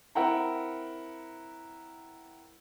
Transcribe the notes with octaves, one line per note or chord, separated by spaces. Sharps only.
C4 E4 A#4 F#5 G5 A#5